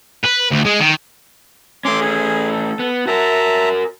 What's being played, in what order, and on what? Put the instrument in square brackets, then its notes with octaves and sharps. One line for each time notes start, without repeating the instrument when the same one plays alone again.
[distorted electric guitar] B4
D2
G#3
D#3
[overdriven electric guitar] A3 C#4 [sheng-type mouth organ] C6 D6
[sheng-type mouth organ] G#4
A4
[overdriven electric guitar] B3
[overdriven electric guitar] F#4 A#4 [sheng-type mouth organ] E5 A5 A#5